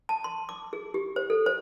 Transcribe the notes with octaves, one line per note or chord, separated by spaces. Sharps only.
A5
C6
D6
G#4
G4
C5
A4
C5